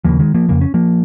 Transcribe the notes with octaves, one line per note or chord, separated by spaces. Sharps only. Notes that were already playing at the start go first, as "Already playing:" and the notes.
D#2 C#3 F3 A#3
D#3 G#3
F3 A#3
F2 C#3 A#3
C#4
F3 A#3